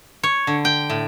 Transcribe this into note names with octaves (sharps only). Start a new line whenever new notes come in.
C#5
D3
G5
A2